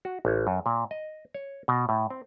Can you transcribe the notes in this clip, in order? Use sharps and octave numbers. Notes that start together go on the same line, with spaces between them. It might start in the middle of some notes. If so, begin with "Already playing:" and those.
F#4
A1
F#2
A#2
D#5
C#5
B2
A2
C4